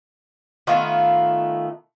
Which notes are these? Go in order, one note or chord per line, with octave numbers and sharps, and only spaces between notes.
D#3 A3 B3 F4